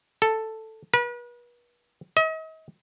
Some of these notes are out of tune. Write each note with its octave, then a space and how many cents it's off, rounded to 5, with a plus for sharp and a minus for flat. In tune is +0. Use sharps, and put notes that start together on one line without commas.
A4 +5
B4 -40
D#5 +40